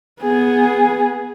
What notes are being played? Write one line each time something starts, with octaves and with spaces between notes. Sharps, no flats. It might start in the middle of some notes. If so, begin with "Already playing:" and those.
B3 G#4